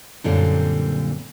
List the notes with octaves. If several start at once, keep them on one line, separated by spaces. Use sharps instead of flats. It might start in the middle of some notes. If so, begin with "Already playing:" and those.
F#2 A#2 D3 G3 C4